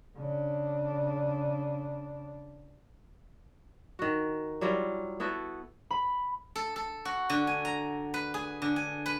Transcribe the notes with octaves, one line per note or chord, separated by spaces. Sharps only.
C#3 D4
D#3 F#4
F#3 G3 E4 F4
B3 E4 F#4 A4
B5
A4
A4
F#4
D3
G#5
A#5
B4
G#4
D3
G#5
B4